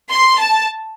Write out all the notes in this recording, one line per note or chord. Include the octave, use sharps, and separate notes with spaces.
C6
A5